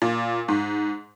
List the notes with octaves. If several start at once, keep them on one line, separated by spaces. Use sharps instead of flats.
A#2
G#2